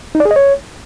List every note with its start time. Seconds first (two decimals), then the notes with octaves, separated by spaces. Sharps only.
0.15 D#4
0.20 D5
0.25 G#4
0.31 D#5
0.36 C#5